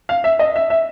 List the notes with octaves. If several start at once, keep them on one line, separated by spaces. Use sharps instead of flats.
F5
E5
D#5
E5
E5